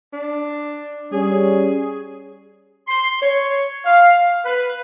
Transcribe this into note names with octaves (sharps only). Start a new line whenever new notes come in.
D4
G3 C#4 G#4
C6
C#5
F5
B4